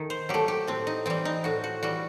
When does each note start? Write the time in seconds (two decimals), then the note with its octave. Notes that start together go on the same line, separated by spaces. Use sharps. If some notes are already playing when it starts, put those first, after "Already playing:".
Already playing: D#3 A3
0.10 C5
0.29 F#3 A3 G4
0.48 G4
0.67 A2 C4
0.87 D#4
1.06 E3 G3 C4
1.25 D#4
1.44 A2 F#4
1.64 F#4
1.83 E3 G3 F#4